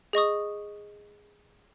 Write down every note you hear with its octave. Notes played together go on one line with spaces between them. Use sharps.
G#4 D#5 C#6 D#6